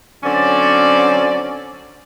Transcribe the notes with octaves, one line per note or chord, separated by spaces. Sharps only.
D3 F#3 C4 C#4 D5